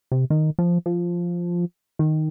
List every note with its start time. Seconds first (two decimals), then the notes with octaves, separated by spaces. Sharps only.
0.12 C3
0.30 D#3
0.59 F3
0.86 F3
1.99 D#3